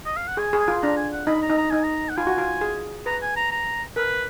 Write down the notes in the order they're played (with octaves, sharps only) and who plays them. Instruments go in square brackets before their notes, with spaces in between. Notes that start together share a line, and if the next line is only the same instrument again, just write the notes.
[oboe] D#5
F5
F#5
[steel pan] G#4 [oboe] G#5
[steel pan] G#4
[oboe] G#5
[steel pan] F4
[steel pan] D4 [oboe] A#5
[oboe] G#5
F#5
[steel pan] D#4 [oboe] B5
[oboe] A#5
[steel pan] D#4
[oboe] A#5
[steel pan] D#4 [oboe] G#5
[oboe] A#5
F#5
[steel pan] F4 [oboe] G#5
[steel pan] F#4
F4
G#4
[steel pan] B4 [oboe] A#5
[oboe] G#5
A#5
A#5
[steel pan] A#4 [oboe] B4